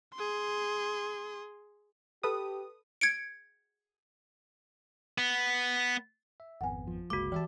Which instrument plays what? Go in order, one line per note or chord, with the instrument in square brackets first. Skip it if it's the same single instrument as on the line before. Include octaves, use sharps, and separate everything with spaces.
[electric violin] G#4 C6
[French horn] G4 [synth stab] A4 B4 D#6
[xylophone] G#6 C#7 D7
[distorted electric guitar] B3
[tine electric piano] E5
[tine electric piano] G#1 F2 B3 [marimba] F#5 G#5
[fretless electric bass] F3
[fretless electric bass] G1 G#3 [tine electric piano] C#2 A#3 [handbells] F#4 D6
[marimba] E3 [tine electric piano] G4 E5 A5